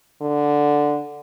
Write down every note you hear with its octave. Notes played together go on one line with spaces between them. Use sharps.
D3